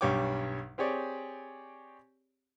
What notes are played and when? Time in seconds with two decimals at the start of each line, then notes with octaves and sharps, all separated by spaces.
0.01 B1 G2 G3 C#5 G5 D6
0.78 C4 G4 G#4 C#5 D5